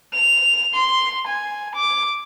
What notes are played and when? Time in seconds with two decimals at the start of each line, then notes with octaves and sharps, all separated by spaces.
0.14 F7
0.74 C6
1.27 G#5
1.75 D6